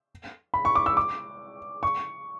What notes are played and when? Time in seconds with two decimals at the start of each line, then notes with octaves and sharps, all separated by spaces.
0.54 B5
0.65 C#6
0.75 D6
0.86 E6
0.97 D6
1.83 C#6